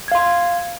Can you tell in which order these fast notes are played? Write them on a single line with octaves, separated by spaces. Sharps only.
G#6 F5 C6